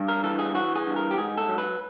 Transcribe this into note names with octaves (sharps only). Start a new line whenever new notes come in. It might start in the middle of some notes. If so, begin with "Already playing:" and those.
Already playing: G2
A#4
E3 A4
G#4
E3 F#4
G#4
G2
A#4
G4
G#2 G#4
A4
F#3
B4